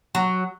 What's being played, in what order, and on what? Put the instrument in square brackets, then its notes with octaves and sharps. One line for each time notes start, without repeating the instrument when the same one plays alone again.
[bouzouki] F#3